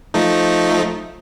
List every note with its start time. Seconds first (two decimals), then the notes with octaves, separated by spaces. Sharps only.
0.14 F3 A3 D#4